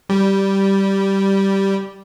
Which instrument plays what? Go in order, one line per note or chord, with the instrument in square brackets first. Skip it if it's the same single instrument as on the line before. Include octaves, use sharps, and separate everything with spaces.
[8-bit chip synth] G3